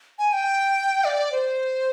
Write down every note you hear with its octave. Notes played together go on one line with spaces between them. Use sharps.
G#5
G5
D5
C5